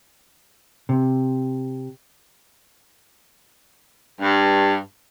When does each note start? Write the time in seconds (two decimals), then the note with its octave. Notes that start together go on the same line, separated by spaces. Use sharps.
0.89 C3
4.20 G2